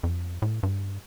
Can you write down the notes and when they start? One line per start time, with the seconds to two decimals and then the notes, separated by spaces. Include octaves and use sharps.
0.03 F2
0.42 A2
0.63 G2